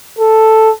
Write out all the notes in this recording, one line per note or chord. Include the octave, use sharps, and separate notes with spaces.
A4